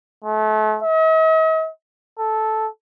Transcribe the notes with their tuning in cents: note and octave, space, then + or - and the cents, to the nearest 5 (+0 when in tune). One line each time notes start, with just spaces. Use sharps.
A3 -35
D#5 +45
A4 -10